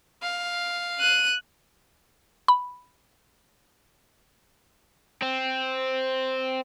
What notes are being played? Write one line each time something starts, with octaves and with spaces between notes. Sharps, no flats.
F5
F#6 D#7
B5
C4